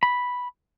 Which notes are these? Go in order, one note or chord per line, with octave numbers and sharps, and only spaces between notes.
B5